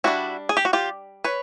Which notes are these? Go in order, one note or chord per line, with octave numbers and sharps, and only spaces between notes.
G3 B3 D4 E4 F#4
G#4
G4
F#4
F4 G4
B4 C#5